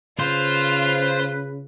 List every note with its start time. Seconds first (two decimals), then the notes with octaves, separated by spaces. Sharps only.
0.19 C#3 F4 B4 C5